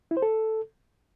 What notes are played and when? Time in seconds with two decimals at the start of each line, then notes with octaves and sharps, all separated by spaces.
0.11 E4
0.17 C5
0.22 A4